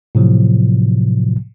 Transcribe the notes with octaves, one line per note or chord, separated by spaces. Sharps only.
A2 C3 F3 F#3